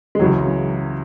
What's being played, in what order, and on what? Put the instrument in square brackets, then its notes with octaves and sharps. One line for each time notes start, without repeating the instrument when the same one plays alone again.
[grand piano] G#3
[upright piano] C#2 C#3 E3 [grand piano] F#3